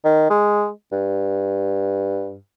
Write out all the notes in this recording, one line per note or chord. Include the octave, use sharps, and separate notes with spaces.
D#3
G#3
G2